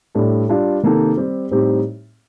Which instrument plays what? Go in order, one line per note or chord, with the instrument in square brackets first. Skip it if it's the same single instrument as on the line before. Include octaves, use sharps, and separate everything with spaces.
[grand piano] A2 G3 D4 A4
G3 D4 F4
C3 D#3 A#3 D#4 A4
G3 C4 G4
A2 G3 C4 D#4 G4